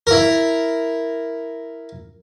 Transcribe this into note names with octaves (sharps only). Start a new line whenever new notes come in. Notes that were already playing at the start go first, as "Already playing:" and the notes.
E4 A#4